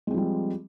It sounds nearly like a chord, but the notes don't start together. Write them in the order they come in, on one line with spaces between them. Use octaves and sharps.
G#3 C4 F3 G3